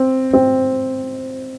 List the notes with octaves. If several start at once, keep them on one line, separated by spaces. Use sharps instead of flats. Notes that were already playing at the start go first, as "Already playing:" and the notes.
Already playing: C4
C4